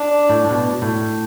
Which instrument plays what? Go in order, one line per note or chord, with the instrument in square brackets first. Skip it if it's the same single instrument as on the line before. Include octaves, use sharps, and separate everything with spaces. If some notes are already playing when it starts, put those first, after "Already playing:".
Already playing: [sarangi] D4
[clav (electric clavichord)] A2
B2
A2